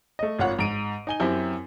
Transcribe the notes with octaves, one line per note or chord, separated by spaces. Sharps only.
A3 D#5
G#1 F4 C#5 F#5
G#2 D7 D#7
D#4 G#5 G7
F#2 C4 E4 G4